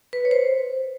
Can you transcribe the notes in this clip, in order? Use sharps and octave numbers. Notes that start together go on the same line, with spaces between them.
B4
C#5
C5